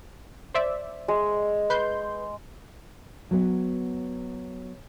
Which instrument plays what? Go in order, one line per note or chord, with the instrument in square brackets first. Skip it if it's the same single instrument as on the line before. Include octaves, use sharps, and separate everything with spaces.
[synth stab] C5 D5 E5
[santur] G#3
[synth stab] B4 C6 G6
[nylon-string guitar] F#3 B3